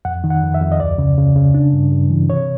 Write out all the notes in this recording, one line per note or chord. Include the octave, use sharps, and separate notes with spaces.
F2 F#5
D#3
F#5
F2
E5
F2
D#5
D2 D5
C#3
C#3
C#3
D4
G2
G2
E3
C3 C#5